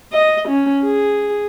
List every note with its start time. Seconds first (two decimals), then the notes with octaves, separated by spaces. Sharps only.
0.13 D#5
0.49 C#4
0.84 G#4